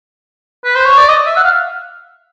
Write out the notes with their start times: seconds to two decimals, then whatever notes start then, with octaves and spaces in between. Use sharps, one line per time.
0.65 B4
0.75 C5
0.86 C#5
0.98 D5
1.09 D#5
1.27 E5
1.37 F#5
1.44 F5